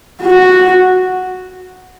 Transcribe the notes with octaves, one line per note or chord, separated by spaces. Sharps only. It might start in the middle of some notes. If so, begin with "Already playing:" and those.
F#4